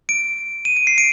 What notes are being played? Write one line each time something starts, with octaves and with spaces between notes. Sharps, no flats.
D7
D#7
D7
C7
D7